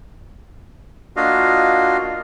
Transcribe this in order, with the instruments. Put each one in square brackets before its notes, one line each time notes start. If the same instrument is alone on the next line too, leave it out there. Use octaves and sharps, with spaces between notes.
[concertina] A#3 D4 F4 F#4 D#5 F5